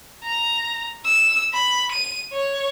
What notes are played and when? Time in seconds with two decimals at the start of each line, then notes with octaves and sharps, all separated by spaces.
0.23 A#5
1.05 E6
1.53 B5
1.92 D#7
2.32 C#5